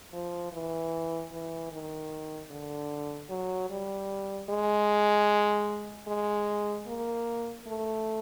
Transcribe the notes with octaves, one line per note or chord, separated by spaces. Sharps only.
F3
E3
E3
D#3
D3
F#3
G3
G#3
G#3
A#3
A3